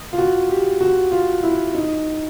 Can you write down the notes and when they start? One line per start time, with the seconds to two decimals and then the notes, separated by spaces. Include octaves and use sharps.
0.13 F4
0.18 F#4
0.50 G4
0.81 F#4
1.12 F4
1.43 E4
1.75 D#4